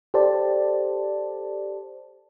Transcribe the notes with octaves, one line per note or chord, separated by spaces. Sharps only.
G4 A4 C5 D5 A5